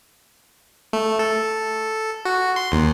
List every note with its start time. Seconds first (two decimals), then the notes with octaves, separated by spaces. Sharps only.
0.93 A3
1.19 A4
2.25 F#4
2.56 C6
2.72 D#2